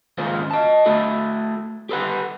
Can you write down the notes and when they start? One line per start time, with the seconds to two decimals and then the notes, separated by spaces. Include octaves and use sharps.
0.18 D#2 G#2 C#3 F4 C5
0.51 D#5 A5
0.86 A3 E4 F#4 A4
1.89 G4 A4 B4 F#5